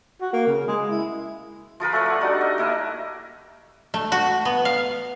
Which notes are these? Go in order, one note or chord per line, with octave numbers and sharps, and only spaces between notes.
F#4
A#3
C#3
G#3
E4
F3 F4 A#4 B4
A3 A4 A#4 C#5
D5 F#5
G3 D4 D#4 F#4
D#5
A#3 E4 A#4
A3
F#4
B3
F5